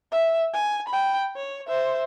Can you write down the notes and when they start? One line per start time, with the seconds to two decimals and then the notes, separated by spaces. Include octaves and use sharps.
0.12 E5
0.54 G#5
0.88 G5 B5
1.36 C#5
1.67 C5 E5